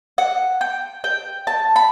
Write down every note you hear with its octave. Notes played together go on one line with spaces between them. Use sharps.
F#5
G5
G5
A5
B5